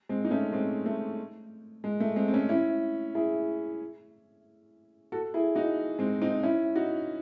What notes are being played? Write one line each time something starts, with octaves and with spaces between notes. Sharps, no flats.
G#3 C4
D#4
A3 C#4
G#3 C4
A3
G#3
A3
G#3 C4
C4
A3 C#4
C#4 E4
E4 G#4
F#4 A4
E4 G#4
D#4 F#4
G#3 C4
C4 D#4
C#4 E4
D#4 F#4